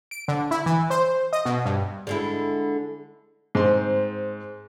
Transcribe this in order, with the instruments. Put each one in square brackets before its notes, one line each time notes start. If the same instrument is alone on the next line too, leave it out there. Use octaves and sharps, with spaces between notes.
[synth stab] D7
D3
E4
E3
C5
D#5
B2
G2
[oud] D3 G#3 E4
[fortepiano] G#2 C4 C6